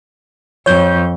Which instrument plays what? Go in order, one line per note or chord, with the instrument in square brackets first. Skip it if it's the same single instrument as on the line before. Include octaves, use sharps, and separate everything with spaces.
[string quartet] F2 [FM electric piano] C#5 G6